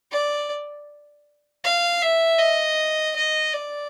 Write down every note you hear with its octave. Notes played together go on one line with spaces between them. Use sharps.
D5
F5
E5
D#5
D#5
D5